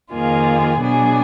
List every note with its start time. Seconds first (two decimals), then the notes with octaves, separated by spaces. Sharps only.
0.12 F2 D#3 A#3 F4 G#4
0.79 B2 F#3 B3 D4 G#4